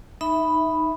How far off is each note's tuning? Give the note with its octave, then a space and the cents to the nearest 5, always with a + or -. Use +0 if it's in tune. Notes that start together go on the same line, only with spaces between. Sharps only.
D#4 +0 E5 -10 B5 +0